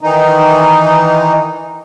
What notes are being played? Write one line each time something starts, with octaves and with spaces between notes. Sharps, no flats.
D#3 E3 D#4